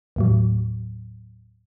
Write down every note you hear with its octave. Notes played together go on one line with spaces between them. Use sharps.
D#2 A2 F#3